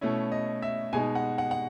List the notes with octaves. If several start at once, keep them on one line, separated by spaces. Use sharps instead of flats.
B2 A3 C#4 E4
D#5
E5
B2 G#3 D#4 G#5
F#5
F#5
F#5